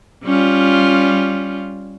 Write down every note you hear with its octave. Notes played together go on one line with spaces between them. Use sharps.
G3 C#4 F4